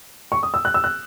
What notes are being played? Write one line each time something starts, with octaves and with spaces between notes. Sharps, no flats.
C#6
D#6
E6
F#6
E6
F#6